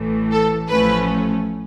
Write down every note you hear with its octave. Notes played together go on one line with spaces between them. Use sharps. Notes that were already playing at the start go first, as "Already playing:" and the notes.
Already playing: A1 A2 E3 A3
A4
A1 A2 F3 A3 C#4 B4